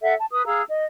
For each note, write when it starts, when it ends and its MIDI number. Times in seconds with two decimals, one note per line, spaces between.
0.02 0.14 69
0.02 0.14 76
0.02 0.14 78
0.18 0.26 81
0.32 0.45 71
0.32 0.45 87
0.46 0.62 68
0.46 0.62 77
0.46 0.62 82
0.46 0.62 88
0.69 0.84 75